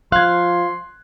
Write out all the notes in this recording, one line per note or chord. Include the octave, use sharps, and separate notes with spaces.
F3 F5 C6 F#6 G#6